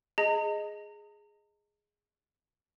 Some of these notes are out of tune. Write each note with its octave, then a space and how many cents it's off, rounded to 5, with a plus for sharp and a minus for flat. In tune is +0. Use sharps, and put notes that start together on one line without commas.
G#4 +0 D#5 +0 A#5 -40